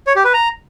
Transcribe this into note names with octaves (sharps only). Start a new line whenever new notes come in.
C#5
G4
B4
A#5